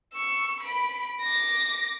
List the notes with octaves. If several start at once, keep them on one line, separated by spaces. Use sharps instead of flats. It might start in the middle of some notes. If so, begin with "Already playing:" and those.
C#6 E6
B5 D7
D6 A#6